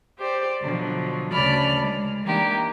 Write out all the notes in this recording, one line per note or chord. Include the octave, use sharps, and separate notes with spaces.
G4 C5 D5
B2 D3 F3 F#3
D2 C#3 D5 A5 B5 F6
G#3
E3 G#3 A#3 D4 D#4 G4